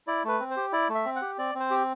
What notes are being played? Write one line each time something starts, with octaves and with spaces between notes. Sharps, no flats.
E4 D5
A3 B4
C4
C5
G4
E4 D5
A3
E5
C4
F#5
G4
C4 D5
C4
C5
G4